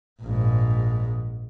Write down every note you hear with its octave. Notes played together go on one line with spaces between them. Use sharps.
A#1 G#2